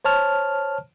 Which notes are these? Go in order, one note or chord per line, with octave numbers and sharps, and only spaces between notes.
C5 C#5 A5 F6